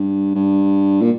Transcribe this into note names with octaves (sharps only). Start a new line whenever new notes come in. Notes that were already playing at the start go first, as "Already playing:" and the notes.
Already playing: G2
G2
A#2